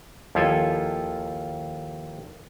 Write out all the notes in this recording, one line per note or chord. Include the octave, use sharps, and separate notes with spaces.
D#2 F3 E4 F4 A4 G#5